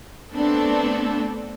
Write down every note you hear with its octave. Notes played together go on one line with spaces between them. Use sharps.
A3 B3 C4 D4 A4